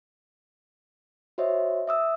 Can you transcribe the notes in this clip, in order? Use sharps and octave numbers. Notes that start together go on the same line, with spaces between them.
F#4 C5 C#5 D#5 E5
E5 D#6 E6